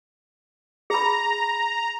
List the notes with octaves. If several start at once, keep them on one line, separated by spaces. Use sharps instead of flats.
G#4 A#5 B5